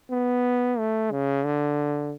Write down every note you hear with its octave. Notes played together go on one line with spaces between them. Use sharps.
B3
A3
C#3
D3